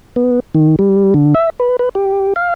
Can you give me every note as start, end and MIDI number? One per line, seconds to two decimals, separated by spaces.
0.16 0.40 59
0.55 0.76 51
0.79 1.14 55
1.14 1.34 50
1.35 1.50 76
1.60 1.77 71
1.79 1.89 71
1.95 2.33 67
2.36 2.54 77